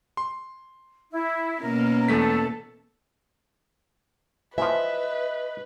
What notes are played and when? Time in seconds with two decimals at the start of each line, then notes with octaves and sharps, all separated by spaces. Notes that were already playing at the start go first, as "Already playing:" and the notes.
0.17 C6
1.11 E4
1.62 B2 A#3 C#4 A#4
2.08 E2 A3 A4 B6
4.58 E3 F3 B4 D#5 E5